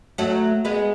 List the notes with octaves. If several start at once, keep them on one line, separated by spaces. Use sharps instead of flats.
F#3 A3
G#3 B3